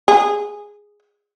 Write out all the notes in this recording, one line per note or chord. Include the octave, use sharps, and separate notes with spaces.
G#4